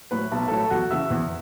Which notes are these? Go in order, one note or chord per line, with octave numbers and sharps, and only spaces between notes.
A2 F#3 B4 B5
B1 A5
B5
A2 F#3 A4 A5
E2 F#4 F#5
C#3 E3 E5 E6
E2